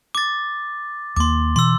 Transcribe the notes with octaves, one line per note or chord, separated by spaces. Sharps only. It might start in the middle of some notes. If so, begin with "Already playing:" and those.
D6 A6
D#2 A#3 C6 D6
B2 E3 C6 E6